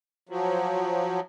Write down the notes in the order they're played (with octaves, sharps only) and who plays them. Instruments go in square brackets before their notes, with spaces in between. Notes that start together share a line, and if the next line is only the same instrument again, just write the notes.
[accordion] F3 F#3